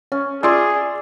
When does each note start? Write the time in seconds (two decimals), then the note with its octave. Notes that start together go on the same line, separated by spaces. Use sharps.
0.12 C#4 C#5
0.43 F4 G#4 D5 E5 C6 E6